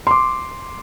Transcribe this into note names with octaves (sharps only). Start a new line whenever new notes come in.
C6 D6